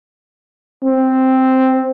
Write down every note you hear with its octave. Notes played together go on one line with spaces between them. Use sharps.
C4